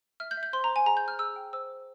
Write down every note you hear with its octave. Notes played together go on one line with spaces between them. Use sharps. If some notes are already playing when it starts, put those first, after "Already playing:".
E5 F6
G6
E5
G6
C5 C6
A#5
C5
G#5
G#4 A#5
G6
C5 F6
G#4 E6
G5
C5 E6
C5